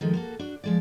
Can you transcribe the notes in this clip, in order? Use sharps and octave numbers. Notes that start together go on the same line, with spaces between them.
D#3 F3 G#3 A3
A#3 F#4 A4
D4 F#4
F3 G#3 D5